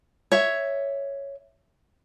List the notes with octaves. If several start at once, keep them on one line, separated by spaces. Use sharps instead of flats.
C#5 E5